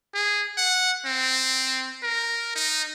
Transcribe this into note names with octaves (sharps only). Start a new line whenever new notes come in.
G#4
F#5
C4
A#4
D#4